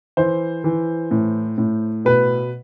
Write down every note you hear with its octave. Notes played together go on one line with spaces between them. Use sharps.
E3 C5
E3
A2
A2
B2 B4